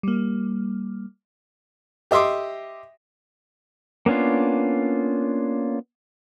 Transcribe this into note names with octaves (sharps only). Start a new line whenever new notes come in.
G3 A#3
G4 D#5 E5 C6 D6
A#3 B3 C#4 D4 F4